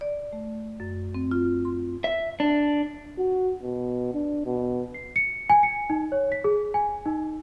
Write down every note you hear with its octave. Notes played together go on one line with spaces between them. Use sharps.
D5
A3
F#2
C4
F4
C6
E5
D4
F#4
B2
D4
B2
C7
C#7
G#5
C#7
D#4
C#5
B6
G#4
G#5
D#4